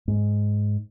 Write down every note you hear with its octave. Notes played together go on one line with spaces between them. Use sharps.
G#2